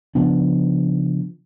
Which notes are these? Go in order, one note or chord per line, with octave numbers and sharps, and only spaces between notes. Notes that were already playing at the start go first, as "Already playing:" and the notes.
C#3 F3 B3 D4